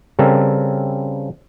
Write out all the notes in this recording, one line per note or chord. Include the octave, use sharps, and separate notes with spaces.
C#3 G3 C4 A4 A#4